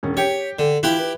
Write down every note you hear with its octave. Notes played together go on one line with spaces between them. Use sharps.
E1 C#4
G4 C#5 G5
D3
E3 E4 F4 G4 G5 F#6
B4